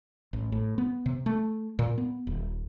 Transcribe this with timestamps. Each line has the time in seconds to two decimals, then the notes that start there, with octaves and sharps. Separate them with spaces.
0.33 A1
0.52 A2
0.78 B3
1.06 C3
1.26 A3
1.79 A#2
1.98 B3
2.27 D#1